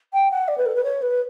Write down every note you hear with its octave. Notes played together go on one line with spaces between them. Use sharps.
G5
F#5
D5
B4
A4
B4
C#5
B4